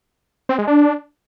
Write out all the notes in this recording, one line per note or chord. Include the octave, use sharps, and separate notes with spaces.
C4
G#3
D4